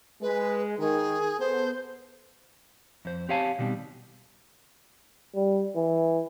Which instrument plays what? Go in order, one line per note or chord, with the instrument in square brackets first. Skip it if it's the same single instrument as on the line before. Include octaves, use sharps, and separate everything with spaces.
[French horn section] G#3 [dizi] B4
[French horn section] D#3 [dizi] G#4
[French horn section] B3 A4 [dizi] C5
[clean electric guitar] F2 C5
C4 G4 C#5 F5 G#5 A5
B2 D#3 G3 C4
[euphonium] G3
E3